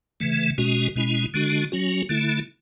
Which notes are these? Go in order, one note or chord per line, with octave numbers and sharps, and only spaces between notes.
C#3 E3 A3
B2 G#3 C#4 F#4
B2 G#3 C#4 E4
D3 G#3 D4 F#4
F#3 C#4 F#4
D3 A3 E4